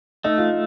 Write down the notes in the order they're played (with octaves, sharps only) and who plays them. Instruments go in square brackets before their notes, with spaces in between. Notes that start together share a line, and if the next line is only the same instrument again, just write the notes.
[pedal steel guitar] A3 [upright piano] D#4
[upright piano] F4